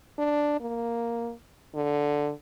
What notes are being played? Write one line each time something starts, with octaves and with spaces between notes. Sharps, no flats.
D4
A#3
D3